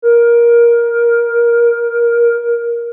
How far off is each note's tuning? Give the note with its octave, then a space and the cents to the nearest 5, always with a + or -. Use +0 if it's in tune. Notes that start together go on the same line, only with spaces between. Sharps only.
A#4 +15